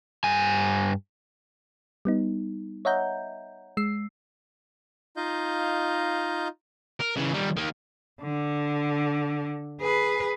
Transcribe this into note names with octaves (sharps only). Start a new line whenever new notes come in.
G2 G#5
G3 B3 D#4
C#5 D#5 E5 F#5 A#5 G6
G#3 E6 C7
D#4 F4 D#5 F5 G6
A#4
C#3 E3
D#3 G3
D#3 A#3
D3
G#4 B4